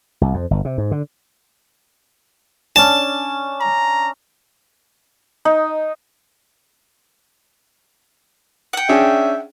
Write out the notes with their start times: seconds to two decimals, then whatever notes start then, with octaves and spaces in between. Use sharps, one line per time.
0.21 C2
0.34 F2
0.51 G1
0.65 C3
0.78 G#2
0.91 D3
2.76 C#4 D4 A5
3.60 A#5
5.45 D#4
8.73 F#5 G5
8.89 C#4 D4 G#4 E5